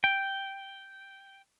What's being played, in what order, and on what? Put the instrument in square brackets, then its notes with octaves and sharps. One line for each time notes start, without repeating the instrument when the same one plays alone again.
[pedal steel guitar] G5